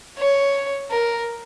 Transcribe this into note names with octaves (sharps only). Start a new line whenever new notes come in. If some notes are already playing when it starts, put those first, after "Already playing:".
C#5
A#4